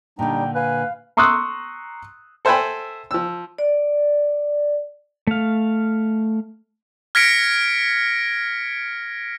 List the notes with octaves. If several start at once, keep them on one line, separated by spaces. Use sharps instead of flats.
A#2 D3 G3 D4 D#4 G5
B4 F5 G#5
A#5 C6 C#6 D#6 E6 F#6
A4 C5 E5 G5 G#5 B5
F3 E6
D5
A3 F5
F6 G#6 A#6 B6 C#7 D7